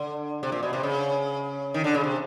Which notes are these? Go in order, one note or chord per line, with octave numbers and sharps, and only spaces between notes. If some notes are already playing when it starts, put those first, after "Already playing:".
Already playing: D3
C3
A#2
B2
C3
C#3
D#3
D3
C#3
C3